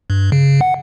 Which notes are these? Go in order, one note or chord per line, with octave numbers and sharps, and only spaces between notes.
G2
C#3
F#5